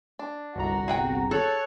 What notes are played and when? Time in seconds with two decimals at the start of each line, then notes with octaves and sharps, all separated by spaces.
0.19 D4
0.56 G1 C2 F#4 A#5
0.88 G#4 F#5 G5
1.31 A4 C#5 F#6